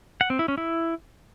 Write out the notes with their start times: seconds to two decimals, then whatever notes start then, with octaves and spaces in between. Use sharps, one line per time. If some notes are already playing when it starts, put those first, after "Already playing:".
0.21 F#5
0.30 C4
0.39 E4
0.48 C#4
0.58 E4